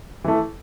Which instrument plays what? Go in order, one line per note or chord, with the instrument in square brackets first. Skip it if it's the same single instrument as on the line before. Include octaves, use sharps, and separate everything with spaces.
[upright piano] E3 A3